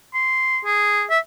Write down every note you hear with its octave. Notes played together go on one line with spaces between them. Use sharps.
C6
G#4
E5